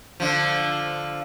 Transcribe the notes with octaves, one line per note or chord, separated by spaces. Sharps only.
D3 F3